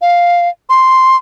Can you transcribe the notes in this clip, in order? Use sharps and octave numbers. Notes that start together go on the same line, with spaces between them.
F5
C6